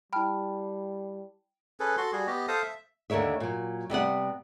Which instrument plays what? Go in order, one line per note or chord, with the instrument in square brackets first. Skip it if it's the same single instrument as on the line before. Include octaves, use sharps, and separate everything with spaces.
[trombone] G3 [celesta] E4 A5 B5 [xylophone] G5 F6
[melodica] C#4 G#4 A4 B4
F#4 A4 C6
G3 F#4 G#4
B3 G4 D#5
A4 C5 F5 D#6
E5
[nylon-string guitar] D#2 D3 A#4 C#5 E5
A#2 F#3
C3 G3 B3 F#5